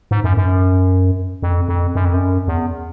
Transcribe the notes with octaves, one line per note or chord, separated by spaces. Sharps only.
G#2
F#2
F#2
F2
F2
F#2
F2
F#2
E2